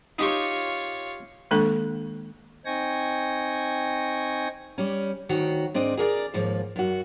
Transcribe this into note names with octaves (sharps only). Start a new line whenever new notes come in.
D#4 F4 G4 C#5 C#6
D#3 G#3 A#3 D4 A4 C#6
C4 D#4 G5 G#5 C#6 A#6
G3 C#4
D2 D#3 F#4 C#5
G#2 C4 D4 D#5
G#4 A#4 C#5 D5
D#2 G#2 F3
F#2 F#4